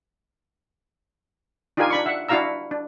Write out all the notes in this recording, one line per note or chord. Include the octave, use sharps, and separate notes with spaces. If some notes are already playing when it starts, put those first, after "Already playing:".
D4 D#4 F4 G4 A#4 G#5
D4 B5 C#6
E5 F#5
D4 E4 F#4 F5 A#5 E6
D4